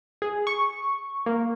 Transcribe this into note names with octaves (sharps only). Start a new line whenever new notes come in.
G#4
C#6
A#3